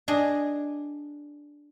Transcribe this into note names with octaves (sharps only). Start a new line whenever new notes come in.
D4 G#4 D#5